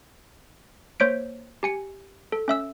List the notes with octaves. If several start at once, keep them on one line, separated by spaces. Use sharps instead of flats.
A#3 C5 C#5 G6 B6 D7
G4 G#5 C#7
A4
C#4 E5 E6